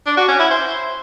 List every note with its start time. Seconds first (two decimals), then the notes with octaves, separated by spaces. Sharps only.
0.06 D4
0.17 F#4
0.28 C#4
0.40 E4
0.51 C5